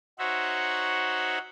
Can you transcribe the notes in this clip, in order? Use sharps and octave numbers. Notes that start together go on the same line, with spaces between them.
D#4 F#4 C5 C#5 E5 F#5